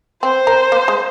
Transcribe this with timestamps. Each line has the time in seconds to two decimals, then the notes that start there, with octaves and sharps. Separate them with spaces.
0.23 C4 C5
0.47 A#4
0.72 A#3
0.88 G#3